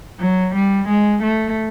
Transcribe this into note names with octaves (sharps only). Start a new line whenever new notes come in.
F#3
G3
G#3
A3